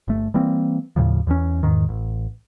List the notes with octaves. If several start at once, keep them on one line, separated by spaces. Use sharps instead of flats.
G1 A3
E3 G3 A#3 C4
D#2 A2 C#3 F3
E2 E3 F#3 C#4
E2 G#2 D#3
A1